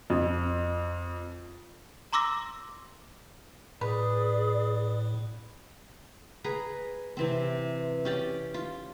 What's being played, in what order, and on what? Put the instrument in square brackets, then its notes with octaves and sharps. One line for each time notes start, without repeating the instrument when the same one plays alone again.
[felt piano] F2
[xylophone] A#5 C6 D6 E6 A#6
[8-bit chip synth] A2 [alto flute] G#4 [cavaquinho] B4 [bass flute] D5
[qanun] G#4 B4 A#5
C3 E3 C4
C#4 G4 D5
F4